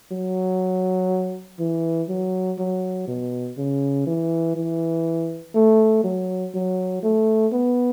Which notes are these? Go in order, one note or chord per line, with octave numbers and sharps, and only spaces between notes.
F#3
E3
F#3
F#3
B2
C#3
E3
E3
A3
F#3
F#3
A3
B3